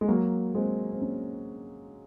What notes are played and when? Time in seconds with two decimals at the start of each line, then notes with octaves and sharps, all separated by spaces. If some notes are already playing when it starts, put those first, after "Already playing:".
0.01 G#3
0.08 F#3 A#3
0.55 G#3 C4
0.92 C4
1.02 A#3 C#4